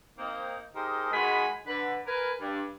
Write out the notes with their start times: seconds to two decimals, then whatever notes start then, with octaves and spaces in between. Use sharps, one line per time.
0.19 A#3 C4 D#4
0.75 D#4 G4 G#4 A#4 C5 D#5
1.12 D#3 G#3 F#4 G#4 B5
1.66 D3 B4
2.07 A#4 B4 G#5
2.41 G2